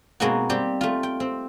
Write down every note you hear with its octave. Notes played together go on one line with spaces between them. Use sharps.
B2 G#3 A#3 C4 D#4 F#4
G3 C4 G4
A3 F4
G5
C4